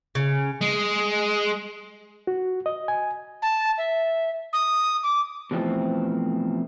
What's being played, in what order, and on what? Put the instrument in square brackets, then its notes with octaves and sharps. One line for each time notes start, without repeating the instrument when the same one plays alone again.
[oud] C#3
[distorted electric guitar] G#3
[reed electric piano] F#4
D#5
G#5
[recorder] A5
E5
D#6
D6
[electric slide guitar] B2 E3 F3 A3 C4